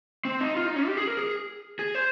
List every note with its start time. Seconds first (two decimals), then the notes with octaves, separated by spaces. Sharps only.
0.25 C4
0.40 D#4
0.56 F4
0.66 D#4
0.76 C#4
0.87 G4
0.97 G#4
1.07 A#4
1.17 G#4
1.79 G#4
1.95 C5